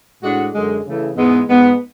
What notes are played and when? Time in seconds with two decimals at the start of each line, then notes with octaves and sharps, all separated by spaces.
0.22 A2 G#3 D4 F#4
0.54 F#2 D3 G#3
0.85 C#3 E3 A3
1.15 G#2 E3 G#3 B3
1.46 G#2 G#3 B3